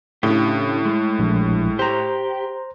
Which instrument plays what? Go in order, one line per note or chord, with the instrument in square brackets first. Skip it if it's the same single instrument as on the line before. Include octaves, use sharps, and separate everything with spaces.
[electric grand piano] A2 [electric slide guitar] C#3 D4 G4
[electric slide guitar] G#3
[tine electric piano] A#1
[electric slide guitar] G4 [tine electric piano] C5 A#5